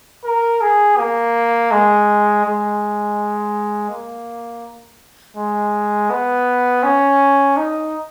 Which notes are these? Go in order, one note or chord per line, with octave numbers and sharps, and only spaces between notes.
A#4
G#4
A#3
G#3
G#3
A#3
G#3
B3
C#4
D#4